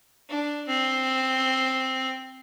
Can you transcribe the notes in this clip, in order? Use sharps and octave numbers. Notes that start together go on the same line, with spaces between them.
D4
C4